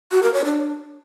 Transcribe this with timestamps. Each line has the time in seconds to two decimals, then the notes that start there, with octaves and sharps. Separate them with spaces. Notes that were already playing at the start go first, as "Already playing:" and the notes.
0.11 F#4
0.22 A#4
0.34 C#5
0.45 D4